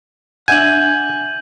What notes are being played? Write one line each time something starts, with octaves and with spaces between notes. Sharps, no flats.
D4 E5 F#5 G#5 G6 F#7